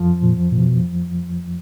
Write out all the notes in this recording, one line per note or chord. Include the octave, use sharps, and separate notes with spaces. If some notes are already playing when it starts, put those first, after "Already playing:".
Already playing: F2 F3
A#2
A#2
B2